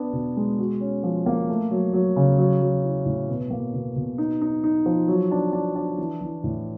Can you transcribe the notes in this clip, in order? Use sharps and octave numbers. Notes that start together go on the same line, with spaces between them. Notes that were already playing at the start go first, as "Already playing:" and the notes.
Already playing: B3 D4
B2
G#3
F#4
C#4
F3
A#3
A3
F#3
F#3
C#3
F#3
F#3
E4
A2
B2
A#3
B2
B2
D#4
D#4
D#4
F3
F#3
D4
D4
D4
E3
E3
A2